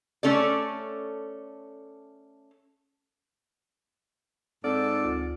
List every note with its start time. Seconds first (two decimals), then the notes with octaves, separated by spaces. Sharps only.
0.23 A3 C#4 A4 D5
4.64 G#2 C4 D#4 A4 D5
5.02 D2 F4